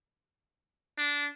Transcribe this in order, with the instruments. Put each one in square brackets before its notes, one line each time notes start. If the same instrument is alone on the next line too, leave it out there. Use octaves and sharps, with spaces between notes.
[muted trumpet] D4